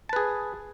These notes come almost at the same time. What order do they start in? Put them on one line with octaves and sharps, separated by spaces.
A5 B4 G#4